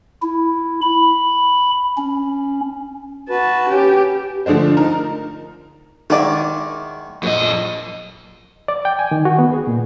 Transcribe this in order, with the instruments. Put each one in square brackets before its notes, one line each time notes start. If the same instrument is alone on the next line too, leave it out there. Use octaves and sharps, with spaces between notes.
[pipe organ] E4
B5
C#4
[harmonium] F#4 B4 [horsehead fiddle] A5
[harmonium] C#4 [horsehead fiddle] G4
[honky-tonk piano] D3 F3 A3 D4 C5
D#4 A#4
[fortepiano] D#3 D5 [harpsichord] F#3 G#3 E4
[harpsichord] A#1 [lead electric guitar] F#2 D#5
[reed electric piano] D5
G5
G#5
D#3
F#4
B3
G#4
A#2